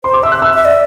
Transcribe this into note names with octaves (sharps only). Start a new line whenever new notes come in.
C5 C6
D6
E5 E6
F#6
E6
E5
D5